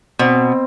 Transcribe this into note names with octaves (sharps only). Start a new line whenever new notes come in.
B2 C4